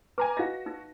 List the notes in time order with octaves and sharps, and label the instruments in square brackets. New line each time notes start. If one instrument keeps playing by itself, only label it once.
[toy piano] B4 [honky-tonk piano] G#5 A#5 D6
[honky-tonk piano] F#4 A#6 [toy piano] D#5 F5
[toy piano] D#4